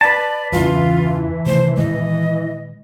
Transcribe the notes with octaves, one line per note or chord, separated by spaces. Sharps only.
B4 D5 A5
E2 G2 C#3 E3 F4
C3 D#3 A3 C5
A#2 D#3 G#3 D#5